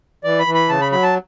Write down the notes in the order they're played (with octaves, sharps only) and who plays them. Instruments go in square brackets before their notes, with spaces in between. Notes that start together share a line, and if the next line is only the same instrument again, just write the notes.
[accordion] E3 D5
B5
E3
B5
C#3 A5
B5
F#3 B5
A5